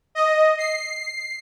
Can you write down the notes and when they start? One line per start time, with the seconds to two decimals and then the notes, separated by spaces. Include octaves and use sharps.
0.15 D#5
0.58 C7